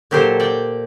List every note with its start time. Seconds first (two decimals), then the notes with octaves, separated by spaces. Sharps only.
0.11 A#2 F#3 G4 A4 C5
0.40 D5 G5